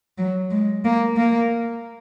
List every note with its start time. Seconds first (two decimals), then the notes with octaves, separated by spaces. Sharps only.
0.18 F#3
0.51 G#3
0.85 A#3
1.17 A#3